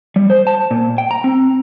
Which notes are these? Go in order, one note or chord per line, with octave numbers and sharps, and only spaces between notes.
G3
C5
A5
A#2
G5
A#5
C4